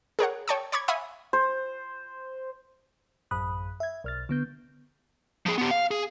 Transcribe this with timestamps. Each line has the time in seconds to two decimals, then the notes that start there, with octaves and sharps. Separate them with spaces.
0.19 G#4 A#4 C#5 F#5
0.48 C#5 G5 A5 C#6 D#6
0.72 C#5 B5 C#6 D6 G#6
0.88 E5 F5 G#5 B5 C#6 D#6
1.33 C5
3.31 A1 F#2 B5 D#6 F#6
3.80 E5 G#6
4.04 B1 F6 A6
4.29 D3 B3 G6
5.46 F3 G#4
5.58 B3 G4
5.71 F5
5.91 G#4